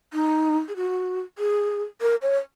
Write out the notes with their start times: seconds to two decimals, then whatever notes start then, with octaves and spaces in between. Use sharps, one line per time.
0.13 D#4
0.68 G#4
0.76 F#4
1.38 G#4
2.01 A#4
2.22 C#5